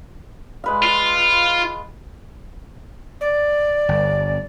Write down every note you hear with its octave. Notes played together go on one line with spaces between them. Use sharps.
G#3 B4 F5
F4
D5
G1